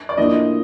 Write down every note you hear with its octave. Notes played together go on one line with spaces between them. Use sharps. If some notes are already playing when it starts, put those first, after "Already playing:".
D5
A2 F3 A#3 D4 F4 D#5